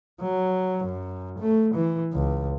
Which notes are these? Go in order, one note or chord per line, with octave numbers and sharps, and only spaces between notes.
F#3
F#2
A3
E3
C#2